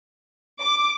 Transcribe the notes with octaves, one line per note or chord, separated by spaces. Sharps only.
D6